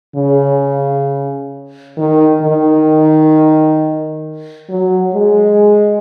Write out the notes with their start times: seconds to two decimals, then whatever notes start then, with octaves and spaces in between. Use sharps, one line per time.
0.16 C#3
1.98 D#3
2.43 D#3
4.70 F#3
5.15 G#3